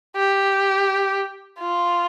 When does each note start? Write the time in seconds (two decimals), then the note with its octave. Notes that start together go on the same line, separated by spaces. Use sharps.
0.16 G4
1.60 F4